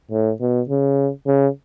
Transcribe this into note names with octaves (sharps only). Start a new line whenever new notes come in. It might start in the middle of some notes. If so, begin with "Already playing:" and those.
A2
B2
C#3
C#3